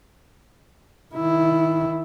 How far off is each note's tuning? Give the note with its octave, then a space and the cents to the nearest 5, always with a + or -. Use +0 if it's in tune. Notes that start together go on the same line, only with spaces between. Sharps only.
D#3 +25 E4 +0